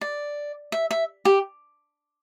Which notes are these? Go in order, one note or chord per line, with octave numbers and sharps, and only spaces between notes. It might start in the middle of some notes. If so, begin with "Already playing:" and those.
D5
E5
E5
G4